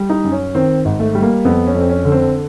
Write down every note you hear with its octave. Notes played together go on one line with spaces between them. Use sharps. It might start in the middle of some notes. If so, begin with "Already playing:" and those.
Already playing: G3
D#4
F#2
C#4
D#3 C4
G#1
A3
G3
A#3
F2 B3
C#4
F2
C4
C#4
D3
C4